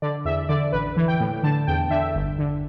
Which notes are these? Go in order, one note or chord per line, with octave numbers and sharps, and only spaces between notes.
D3 D5
E2 E5
D3 D5
A1 B4
E3
G5
A2
D3 A5
E2 G5
D3 E5
G1
D3